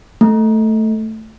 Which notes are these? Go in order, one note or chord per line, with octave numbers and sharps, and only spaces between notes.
A3